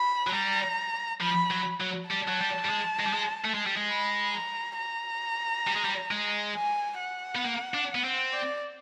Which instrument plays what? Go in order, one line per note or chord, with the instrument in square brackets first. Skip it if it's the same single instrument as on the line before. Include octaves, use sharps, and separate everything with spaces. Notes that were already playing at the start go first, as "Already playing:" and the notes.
Already playing: [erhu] B5
[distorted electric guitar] F#3
[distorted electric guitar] G3 [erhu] A#5
[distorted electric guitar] F3 [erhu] B5
[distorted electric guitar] F#3
F#3
[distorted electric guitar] G3 [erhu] A5
[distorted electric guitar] F#3
G3
G3
G#3
G#3
G3
G#3
A3
G#3
G3
G#3
[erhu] B5
A#5
A#5
[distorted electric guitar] G3
G#3
G3
G#3
[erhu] G#5
F#5
[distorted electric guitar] B3
A#3
D4
B3
C4
[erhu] D5